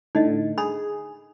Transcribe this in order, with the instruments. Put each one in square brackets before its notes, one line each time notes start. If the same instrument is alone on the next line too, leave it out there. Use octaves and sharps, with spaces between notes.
[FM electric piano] A2 D3 [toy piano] D#4 D#5
[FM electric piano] G#4 [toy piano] B5